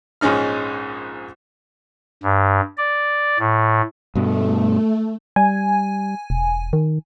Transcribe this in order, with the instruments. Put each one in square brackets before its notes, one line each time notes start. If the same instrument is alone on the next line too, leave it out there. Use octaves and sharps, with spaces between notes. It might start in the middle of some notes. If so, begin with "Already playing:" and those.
[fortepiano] A#1 G#2 G#3 C#4 D#4 F6
[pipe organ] G2
D5
A2
[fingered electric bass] G2 B2 [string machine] A3
[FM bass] G3 [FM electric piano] G#5
[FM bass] E1
D#3